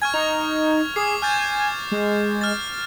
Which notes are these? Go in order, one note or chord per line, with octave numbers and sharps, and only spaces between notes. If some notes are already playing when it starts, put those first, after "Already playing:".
G#5 C#6 F6 G#6
D#4 F7
G#4 D6 C7
G#5 F6 G6 A6
G#3
F6 A6